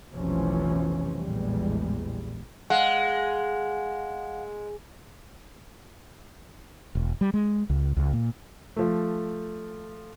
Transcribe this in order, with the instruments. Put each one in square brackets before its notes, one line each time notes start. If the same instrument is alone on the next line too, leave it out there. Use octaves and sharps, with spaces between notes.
[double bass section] F1 B1 C3 E3 F3 C#4
A#1 E2 A2 G3 G#3
[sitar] G#3 [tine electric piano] F5 F#5
[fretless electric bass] E1
G3
G#3
C#2
C#2
A#2
[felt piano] F3 A3